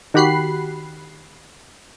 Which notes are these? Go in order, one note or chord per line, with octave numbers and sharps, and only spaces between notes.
D#3 F#4 G4 B5 F#6 C7